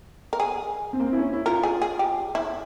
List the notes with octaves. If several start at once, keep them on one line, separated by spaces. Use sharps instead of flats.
A#4
G#4
C4
A#3
C4
E4
C#4
E4
F4 A#4
G#4
G#4
G4
E4